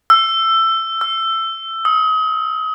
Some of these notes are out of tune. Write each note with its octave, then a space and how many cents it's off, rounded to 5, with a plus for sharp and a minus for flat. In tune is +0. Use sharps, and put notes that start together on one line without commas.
E6 +15
E6 +15
D#6 +35